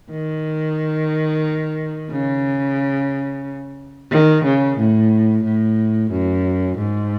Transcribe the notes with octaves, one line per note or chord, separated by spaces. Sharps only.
D#3
C#3
D#3
C#3
A2
A2
F#2
G#2